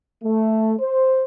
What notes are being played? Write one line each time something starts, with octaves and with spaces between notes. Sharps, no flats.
A3
C5